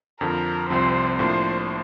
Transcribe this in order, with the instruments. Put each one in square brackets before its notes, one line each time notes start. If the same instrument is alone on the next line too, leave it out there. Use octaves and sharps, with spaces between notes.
[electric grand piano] F2 D3 F3 [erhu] A#4
[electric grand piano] C2 C3 F3 C4 [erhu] C5
[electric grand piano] A2 F3 A#3 D4 [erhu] C5